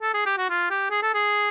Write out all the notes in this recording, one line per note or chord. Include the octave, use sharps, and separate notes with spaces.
A4
G#4
G4
F#4
F4
G4
G#4
A4
G#4